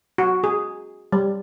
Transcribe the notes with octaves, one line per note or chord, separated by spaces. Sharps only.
F#4
G#4
G3